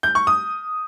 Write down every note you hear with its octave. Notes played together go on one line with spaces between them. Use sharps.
G6
C#6
D#6